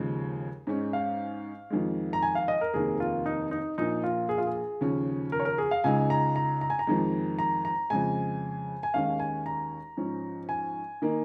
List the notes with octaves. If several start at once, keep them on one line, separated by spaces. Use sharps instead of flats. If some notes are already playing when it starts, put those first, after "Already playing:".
Already playing: D#2 C#3 F3 G#3
G#2 G#3 C#4
F5
F2 D#3 G#3
A#5
G#5
F5
D#5
A#4
F1 D#2 D#3 A#3 G#4
F4
D#4
D#4
A#1 A#2 A#3 D#4
F4
G#4
F4
G#4
D#2 C#3 F3 C#4
A#4
C#5
A#4
G#4
F5
C#2 C#3 G#3 D#4 G#5
A#5
A#5
A#5
G#5
A#5
F2 D#3 G#3
A#5
A#5
F2 C#3 G#3 G#5
G#5
D#2 D#3 G#3 C#4 F5
G#5
A#5
G#2 F3 C#4
G#5
D#3 A#3 D#4